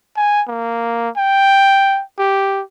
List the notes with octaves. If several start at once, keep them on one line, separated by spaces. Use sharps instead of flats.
G#5
A#3
G5
G4